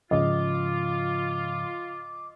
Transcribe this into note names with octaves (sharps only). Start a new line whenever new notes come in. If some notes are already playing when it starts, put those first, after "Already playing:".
G#2 C#3 F3 F4 D#5 D6